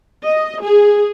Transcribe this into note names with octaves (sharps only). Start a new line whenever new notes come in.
D#5
G#4